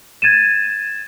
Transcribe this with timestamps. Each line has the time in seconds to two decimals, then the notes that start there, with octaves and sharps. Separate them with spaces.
0.22 G#6 A6 D#7 E7